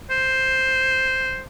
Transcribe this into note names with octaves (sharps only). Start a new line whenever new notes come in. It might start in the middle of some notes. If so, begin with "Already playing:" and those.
C5